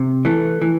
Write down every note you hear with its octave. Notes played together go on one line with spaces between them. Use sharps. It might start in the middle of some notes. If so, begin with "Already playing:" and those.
Already playing: C3
E3 A3
E3